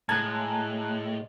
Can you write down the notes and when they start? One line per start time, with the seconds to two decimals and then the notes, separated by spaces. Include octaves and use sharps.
0.09 A2 G#3 A5 A#5 F#6 G#6